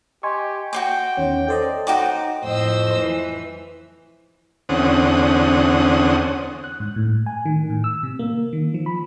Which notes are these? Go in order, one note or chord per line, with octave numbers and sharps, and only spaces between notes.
G4 D#5 G#5 C6 C#6
F#4 C5 G5 D6
E2 D#3 C#4 C#5
A4 C5 D5 D#5
D#4 F#4 G5 D6
F2 A2 C5 D#5 E6
E3
E2 D3 C4 C#4 F#5 D#6
F#6
G#2
A2
G#5
D#3
A2
E6
C3
A#3
D#3
F3
B5